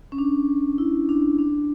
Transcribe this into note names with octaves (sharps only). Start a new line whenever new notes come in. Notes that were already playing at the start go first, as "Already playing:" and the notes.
C#4
D4
E4
D4
D4